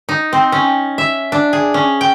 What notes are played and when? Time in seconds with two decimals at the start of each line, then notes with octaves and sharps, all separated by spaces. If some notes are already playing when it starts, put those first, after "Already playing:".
0.09 D#4
0.33 C4
0.52 C#4
0.98 E5
1.32 D4
1.53 G#4
1.74 C#4
2.01 G5